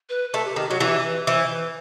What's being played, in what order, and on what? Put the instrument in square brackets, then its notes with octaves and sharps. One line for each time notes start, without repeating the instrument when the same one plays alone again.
[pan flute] B4
[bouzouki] A3 [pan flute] A4
[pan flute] G4
[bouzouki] D#3 [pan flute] G4
[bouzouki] F#3 [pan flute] F#4
[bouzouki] E3 [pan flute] G4
[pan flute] B4
[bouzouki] E3 [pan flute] C5
[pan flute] B4